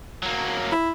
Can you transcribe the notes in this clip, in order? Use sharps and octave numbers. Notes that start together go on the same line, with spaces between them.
F#3 A#3
E4